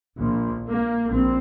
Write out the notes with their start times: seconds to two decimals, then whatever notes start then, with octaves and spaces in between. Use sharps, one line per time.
0.20 A#1 A#2
0.66 A#3
1.10 A#1 C4